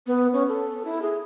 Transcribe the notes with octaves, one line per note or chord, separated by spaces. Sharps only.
B3
C#4
A4
E4
G#4